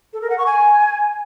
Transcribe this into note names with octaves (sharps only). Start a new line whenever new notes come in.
A4
A#4
F#5
C#6
G#5